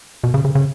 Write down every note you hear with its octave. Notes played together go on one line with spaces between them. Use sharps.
B2
C#3
C#3
C#3